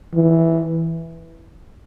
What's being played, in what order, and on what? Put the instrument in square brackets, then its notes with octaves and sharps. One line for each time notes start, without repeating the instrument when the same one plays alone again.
[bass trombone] E3